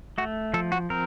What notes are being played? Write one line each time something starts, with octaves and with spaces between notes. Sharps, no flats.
A3 F#4
F3 A4
F#4
C4 A#4